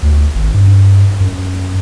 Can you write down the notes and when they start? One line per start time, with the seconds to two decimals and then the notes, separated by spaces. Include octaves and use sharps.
0.03 D2
0.35 G#1
0.54 G2
1.20 F#2